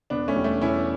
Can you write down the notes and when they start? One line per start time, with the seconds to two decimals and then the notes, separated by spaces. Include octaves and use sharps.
0.10 E1 B3 D4
0.28 A3 C#4
0.36 E2 B2 G3
0.44 A3
0.61 E1 C#4 E4